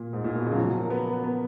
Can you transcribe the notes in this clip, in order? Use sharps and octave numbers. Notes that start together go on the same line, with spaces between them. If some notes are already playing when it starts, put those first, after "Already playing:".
Already playing: A#2
G#2
A#2
B2
C#3
F#3
F3
F#3
A#3
B3
B3
B3